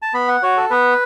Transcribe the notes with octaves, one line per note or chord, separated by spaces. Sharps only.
A5
B3 B5
F#5
F#4 C#5
A4
B3 B4